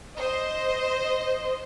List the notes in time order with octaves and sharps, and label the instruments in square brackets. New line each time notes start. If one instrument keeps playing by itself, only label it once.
[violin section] C5 D#5